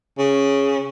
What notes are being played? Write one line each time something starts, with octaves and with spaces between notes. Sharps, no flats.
C#3